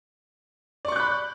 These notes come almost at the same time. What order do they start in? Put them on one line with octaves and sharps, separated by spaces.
D5 C#6 G6 F#6 B5